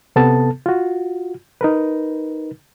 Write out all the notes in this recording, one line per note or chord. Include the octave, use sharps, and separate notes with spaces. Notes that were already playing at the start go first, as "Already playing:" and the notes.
C3 B3 A4 A5
F4 F#4
D#4 A#4 B4